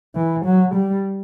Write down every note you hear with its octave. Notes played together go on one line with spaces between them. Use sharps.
E3
F#3
G3